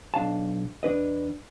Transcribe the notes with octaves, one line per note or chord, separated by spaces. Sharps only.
B1 D4 F5 A5
E2 D4 B4 D#5